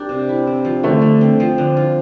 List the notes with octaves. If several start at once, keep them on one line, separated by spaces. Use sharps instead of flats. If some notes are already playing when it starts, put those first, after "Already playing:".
Already playing: G3 D4 G4 A#4
C3
E4
C4
F3
D3 A3
D3
C4
F3
D3
F4